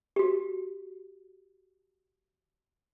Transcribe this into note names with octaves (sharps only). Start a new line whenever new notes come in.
F#4 G4